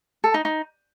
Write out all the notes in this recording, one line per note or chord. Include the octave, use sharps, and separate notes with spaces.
A4
D#4
D#4